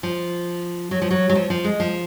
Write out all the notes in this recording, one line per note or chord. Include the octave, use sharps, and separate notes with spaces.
F3
F#3
F3
F#3
F#3
F3
F3
G#3
F3